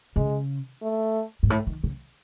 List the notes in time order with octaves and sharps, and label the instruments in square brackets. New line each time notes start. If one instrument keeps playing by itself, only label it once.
[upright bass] C#3 [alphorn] G#3
[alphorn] A3
[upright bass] G#2
A2
D#3
C#3